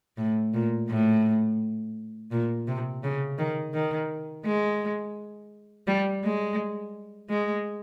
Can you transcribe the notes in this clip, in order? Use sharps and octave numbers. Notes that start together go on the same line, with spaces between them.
A2
A#2
A2
A#2
C3
C#3
D#3
D#3
G#3
G3
G#3
G#3